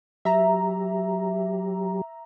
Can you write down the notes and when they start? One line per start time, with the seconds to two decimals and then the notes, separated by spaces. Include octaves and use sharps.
0.25 F#3 G4 E5 A#5